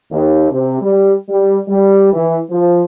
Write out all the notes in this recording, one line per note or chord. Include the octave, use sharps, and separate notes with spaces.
D#2
C3
G3
G3
G3
E3
F3